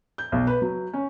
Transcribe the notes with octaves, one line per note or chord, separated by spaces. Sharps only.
G6
B1
B4
F#3
C#4